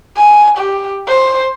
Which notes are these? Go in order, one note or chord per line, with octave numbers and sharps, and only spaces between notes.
G#5
G4
C5